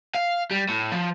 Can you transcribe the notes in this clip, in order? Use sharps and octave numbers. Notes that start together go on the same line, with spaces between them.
F5
G3
A2
F3